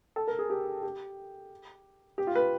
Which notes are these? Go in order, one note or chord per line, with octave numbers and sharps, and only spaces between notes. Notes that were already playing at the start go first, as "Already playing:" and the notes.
A4
A#4
G#4
G4
G4
G4
F4
B4